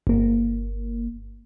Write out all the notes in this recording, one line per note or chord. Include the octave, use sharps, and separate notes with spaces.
G1 A#3